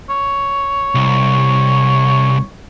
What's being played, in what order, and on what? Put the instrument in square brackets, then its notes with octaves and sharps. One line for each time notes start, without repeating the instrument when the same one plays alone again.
[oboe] C#5
[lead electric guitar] C2